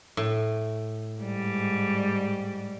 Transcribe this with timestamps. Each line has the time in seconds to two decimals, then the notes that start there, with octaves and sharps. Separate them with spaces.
0.17 A2
1.21 G#2 G3